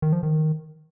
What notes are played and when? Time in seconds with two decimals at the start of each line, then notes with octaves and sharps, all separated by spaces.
0.02 D#3
0.13 F3
0.23 D#3